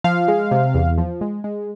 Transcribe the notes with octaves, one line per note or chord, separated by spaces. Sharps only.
F3 F5
G#3
C3
E2
F3
G#3
G#3